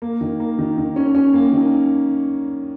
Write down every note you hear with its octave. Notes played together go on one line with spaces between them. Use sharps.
A#3
D#3
A#3
D#3
D#3
C#4
C#4
A#3
D#3